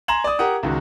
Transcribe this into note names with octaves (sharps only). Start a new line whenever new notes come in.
G#5 A#5 C6 G#6 E7 F#7
D5 D#6
G4 A#4 F#5 D#6
C#2 D#3 F#4